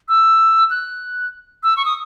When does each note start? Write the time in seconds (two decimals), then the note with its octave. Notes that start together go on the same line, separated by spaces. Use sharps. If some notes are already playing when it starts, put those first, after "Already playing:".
0.08 E6
0.70 F#6
1.63 E6
1.77 C#6
1.85 D#6